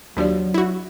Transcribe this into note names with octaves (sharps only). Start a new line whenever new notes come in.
D#2 F3 F#3 D4 G4 D5
E4 F#4